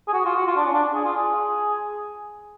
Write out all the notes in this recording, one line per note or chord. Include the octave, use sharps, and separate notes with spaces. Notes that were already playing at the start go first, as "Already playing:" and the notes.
G#4
F#4
F4
F#4
F4
D4
C#4
D4
G#4
F4
G#4